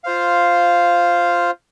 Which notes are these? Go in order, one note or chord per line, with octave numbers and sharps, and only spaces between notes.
F4 C5 F5